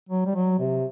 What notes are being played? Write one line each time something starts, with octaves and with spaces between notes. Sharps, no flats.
F#3
G3
F#3
C3